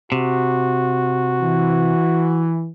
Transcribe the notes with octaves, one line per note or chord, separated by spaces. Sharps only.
C3 F#4
E3